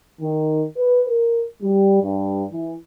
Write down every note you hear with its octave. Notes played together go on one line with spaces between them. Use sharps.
D#3
B4
A#4
G3
G2
E3